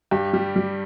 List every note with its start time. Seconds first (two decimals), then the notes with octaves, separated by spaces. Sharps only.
0.11 G2 G4
0.33 G3
0.56 G3